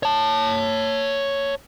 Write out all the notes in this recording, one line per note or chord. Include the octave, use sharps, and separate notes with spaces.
C#5 A5